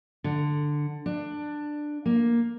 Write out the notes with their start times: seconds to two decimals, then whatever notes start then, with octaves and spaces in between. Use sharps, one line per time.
0.24 D3
1.06 D4
2.06 A#3